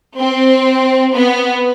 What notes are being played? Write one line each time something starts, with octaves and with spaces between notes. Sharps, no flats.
C4
B3